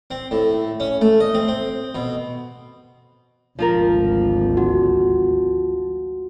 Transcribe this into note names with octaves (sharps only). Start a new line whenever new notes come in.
C4
A2
C#4
A3
D#5
C4
C4
B2
G#1 D2 F3 F4 A#4
F#4